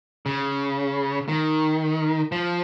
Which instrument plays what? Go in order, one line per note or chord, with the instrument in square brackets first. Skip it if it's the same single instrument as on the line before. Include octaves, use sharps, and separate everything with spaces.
[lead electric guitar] C#3
D#3
F3